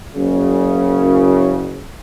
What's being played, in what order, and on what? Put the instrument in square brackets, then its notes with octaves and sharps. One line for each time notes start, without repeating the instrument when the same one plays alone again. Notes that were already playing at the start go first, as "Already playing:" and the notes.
[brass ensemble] F#1 F#2 C#3